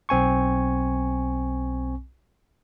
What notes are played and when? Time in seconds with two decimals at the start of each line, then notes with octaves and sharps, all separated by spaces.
0.09 B1 C4 G#5 C#6